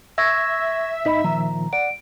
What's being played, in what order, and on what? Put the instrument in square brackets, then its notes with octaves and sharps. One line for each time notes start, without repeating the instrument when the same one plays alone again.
[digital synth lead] E5 [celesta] C#6 G#6 A#6 [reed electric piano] E6
[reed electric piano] G#2 D#4 D#5 [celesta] B5 B6
[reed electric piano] A#2 D#3 F3 [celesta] A#5
[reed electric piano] D5 F#5 [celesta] D7